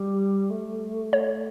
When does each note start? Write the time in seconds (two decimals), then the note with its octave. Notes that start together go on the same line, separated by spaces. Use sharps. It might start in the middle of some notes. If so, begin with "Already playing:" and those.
Already playing: G3
0.49 A3
1.13 C#5